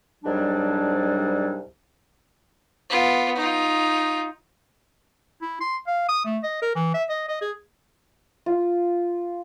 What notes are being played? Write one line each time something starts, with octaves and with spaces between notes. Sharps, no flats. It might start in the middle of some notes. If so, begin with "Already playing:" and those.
C2 G#2 F#3 G3 D4
B3 F4
D#4 F4
E4
C6
F5
D#6
A3
D#5
A#4
E3
E5
D#5
D#5
G#4
F4